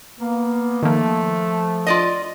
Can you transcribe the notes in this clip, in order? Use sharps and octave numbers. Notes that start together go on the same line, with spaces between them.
A#3 B3
D#3 F3 A3 A#3
F4 D5 D#5